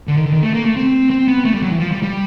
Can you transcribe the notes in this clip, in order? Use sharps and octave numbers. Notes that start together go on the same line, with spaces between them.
D3
D#3
D3
D#3
A3
A#3
A3
C4
C4
B3
A3
G3
F#3
E3
F3
G3
G3